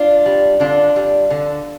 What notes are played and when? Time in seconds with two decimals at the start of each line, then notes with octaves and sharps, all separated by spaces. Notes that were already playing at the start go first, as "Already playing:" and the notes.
Already playing: D4 F4
0.26 G3
0.60 D3 D4 F4
0.96 G3
1.30 D3